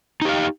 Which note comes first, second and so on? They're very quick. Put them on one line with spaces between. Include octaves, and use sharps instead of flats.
D#4 G4 F5